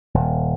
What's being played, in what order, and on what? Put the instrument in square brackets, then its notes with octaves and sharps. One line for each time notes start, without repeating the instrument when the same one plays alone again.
[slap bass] D#1